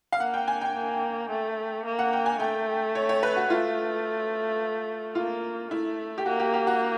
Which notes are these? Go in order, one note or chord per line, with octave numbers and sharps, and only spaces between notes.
F5
A#3 F#5
G5
G#5
G5
A#3
A3
A#3
F#5
G5
G#5
A3 G5
C#5
C#5
B4
F#4
A3 F4
A#3 F4
A3 E4
G4
A#3 F#4
G4
G4
F#4